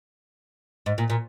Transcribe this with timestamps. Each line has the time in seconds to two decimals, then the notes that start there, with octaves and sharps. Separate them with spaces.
0.86 G#2
0.98 A#2
1.10 A#2